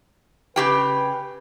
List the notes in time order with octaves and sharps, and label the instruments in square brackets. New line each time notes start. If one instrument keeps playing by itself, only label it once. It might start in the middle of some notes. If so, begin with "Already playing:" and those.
[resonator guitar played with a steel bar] C#3 G4 G5 [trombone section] B4